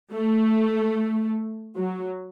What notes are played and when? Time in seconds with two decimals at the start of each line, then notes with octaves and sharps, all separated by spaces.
0.13 A3
1.77 F#3